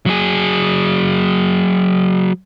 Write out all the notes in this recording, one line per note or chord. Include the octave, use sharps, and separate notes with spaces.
F#3 G#4